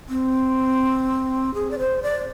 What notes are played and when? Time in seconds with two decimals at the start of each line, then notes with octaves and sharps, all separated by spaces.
0.09 C4
1.54 G#4
1.71 D5
1.79 C5
2.03 D5